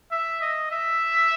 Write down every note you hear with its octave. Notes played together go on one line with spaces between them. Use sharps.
E5
D#5
E5